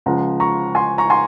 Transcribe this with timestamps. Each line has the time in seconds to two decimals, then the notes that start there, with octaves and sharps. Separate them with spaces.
0.06 C#2 C#3 F3 F#5 A#5
0.40 A#5 C#6
0.75 G#5 C6
0.98 A#5 C#6
1.10 G#5 C6